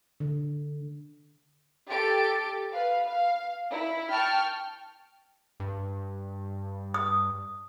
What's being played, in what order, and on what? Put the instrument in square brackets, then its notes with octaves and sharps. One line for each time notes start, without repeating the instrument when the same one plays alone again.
[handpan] D3
[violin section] G4 A4 A6 D7
B4 F5
F5
E4
G5 A5 C#6 F6
[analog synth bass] G2
[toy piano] D#6